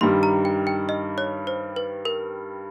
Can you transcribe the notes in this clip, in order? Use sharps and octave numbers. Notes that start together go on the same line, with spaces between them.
G2 D#3 G3 C6
A#5
G5
G5
D#5
C#5
C5
B4
A#4